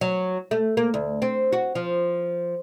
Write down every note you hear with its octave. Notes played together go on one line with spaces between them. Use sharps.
F#3
A3
A#3
D2
C4
F#4
F3